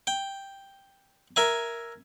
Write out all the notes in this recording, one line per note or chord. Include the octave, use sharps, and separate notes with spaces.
G5
A#4 E5 G#5